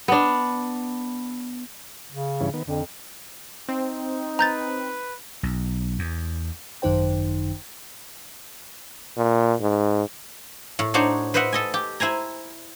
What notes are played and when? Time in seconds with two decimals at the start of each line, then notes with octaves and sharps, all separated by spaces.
0.08 B3 D4
2.11 C#3
2.41 G2 E3 C#4
2.54 D#3 B3
2.68 F2 D3
3.69 C4 D#4
4.39 B4 A#5 G6 A6
5.43 B1
5.99 E2
6.82 G#1 F#2 D#3 D#4 C5 G5
9.17 A#2
9.61 G#2
10.79 A2
10.94 D4 D#4 F#4 C5 C#5
11.34 B4 C5 D#5 E5 F#5
11.52 A4 D#5 G#5
11.74 G4
12.00 E4 C5 G#5 A#5